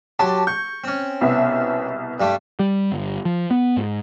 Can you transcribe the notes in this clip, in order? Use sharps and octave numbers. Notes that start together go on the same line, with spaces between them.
F#3 G4 A5 C6
C#6 G6
C4 C#4
C2 B2 E5
G2 G3 A3
G3
G1
F3
B3
G#2